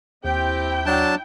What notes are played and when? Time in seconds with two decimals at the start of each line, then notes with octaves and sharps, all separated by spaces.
0.25 D#2 C4 E4 G4 G5
0.86 F#3 D4 A5